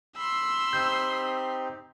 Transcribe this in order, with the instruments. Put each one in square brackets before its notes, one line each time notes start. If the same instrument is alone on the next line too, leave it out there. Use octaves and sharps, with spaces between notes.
[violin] B5 C6 [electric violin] E6
[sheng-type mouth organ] C4 D#4 G4 [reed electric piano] G6